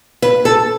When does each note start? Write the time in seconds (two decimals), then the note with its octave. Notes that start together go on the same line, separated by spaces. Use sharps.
0.22 B4
0.45 A4